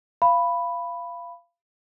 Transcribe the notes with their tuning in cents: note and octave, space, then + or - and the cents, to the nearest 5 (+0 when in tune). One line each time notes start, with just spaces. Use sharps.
F5 -20 B5 +0